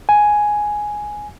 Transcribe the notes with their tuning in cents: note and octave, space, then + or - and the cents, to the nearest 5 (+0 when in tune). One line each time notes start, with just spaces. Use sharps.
G#5 +5